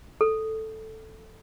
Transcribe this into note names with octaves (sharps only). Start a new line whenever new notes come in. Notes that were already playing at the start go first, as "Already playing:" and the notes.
A4